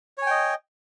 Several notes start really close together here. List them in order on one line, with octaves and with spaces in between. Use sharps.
C#5 G#5 G5 D#5